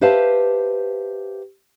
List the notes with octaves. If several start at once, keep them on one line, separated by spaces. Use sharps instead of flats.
G4 B4 C5 E5 F5 A5